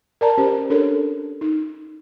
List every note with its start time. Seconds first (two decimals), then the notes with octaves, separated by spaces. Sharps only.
0.21 A#4 D5 A5 A#5
0.38 C#4 G4 C5
0.70 D4 A4 A#4 C#5
1.41 D#4